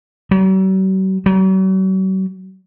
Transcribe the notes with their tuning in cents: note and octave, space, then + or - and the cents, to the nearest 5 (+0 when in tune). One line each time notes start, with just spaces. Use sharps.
F#3 +45
F#3 +45